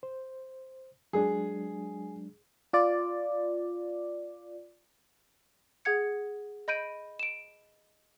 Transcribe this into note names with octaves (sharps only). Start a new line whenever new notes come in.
C5
F#3 G#3 D4 G#4
F4 D5
G#4 F#5 G#6 C#7
D#5 B5 G6 D7 D#7
D7 E7